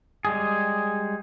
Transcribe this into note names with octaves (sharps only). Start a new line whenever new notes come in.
G3 G#3 G#4